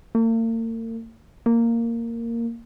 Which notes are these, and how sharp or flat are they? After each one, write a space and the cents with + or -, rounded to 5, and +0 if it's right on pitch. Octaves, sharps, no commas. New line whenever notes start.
A#3 -45
A#3 -10